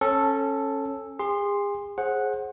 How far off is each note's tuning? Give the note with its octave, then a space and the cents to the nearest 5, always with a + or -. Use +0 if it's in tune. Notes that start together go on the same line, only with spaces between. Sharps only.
C#4 -20 A4 +0
G#4 -40 C6 +5
G#4 +15 C5 +30 F#5 -5